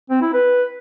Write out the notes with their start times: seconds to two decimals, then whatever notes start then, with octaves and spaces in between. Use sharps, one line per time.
0.10 C4
0.22 E4
0.33 B4